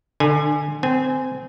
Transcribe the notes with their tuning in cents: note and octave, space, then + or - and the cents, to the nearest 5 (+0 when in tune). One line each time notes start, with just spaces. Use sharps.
D3 +25 G#5 +0
C4 -25 G#5 +0